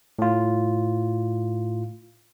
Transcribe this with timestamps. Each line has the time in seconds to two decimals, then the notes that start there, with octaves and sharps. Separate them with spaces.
0.19 A2 F4